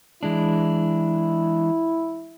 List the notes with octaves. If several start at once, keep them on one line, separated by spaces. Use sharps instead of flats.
E3 G#3 D4 E4